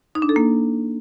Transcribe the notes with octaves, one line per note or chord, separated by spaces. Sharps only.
D#4
D4
A4
A#3